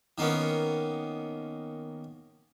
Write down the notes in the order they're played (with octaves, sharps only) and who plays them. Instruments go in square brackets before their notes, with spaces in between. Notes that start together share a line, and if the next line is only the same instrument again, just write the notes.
[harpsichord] D#3 A#3 B3 C#4